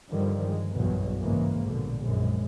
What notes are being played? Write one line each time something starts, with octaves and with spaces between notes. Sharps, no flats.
G2 D3 D#3 F3 G3
G#3
F#1 B1 E2 G2 B2 F#3
G#2 C#3 E3 G#3 A#3
A#1 B2 D3
A#1 F#2 G#3